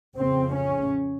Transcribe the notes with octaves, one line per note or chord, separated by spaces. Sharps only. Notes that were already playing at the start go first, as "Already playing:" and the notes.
F2 C#3 C4
C#4